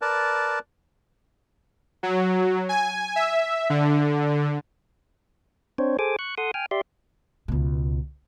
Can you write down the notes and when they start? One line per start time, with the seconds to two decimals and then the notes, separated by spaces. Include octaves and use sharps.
0.02 A#4 B4 D5 A5
2.03 F#3
2.69 G#5
3.16 E5
3.70 D3
5.78 C4 D4 C5 C#5
5.99 G#4 A4 C5 G#5 D6
6.19 C#6 F#6
6.38 A4 F#5 C6 D#6
6.54 G5 G#5 F6
6.71 G4 D5 E5 C6
7.48 C#2 B2